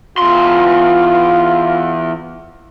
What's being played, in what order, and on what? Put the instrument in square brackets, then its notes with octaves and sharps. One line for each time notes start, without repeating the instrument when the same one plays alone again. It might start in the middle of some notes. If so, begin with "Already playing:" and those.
[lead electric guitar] E2 C6 [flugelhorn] F4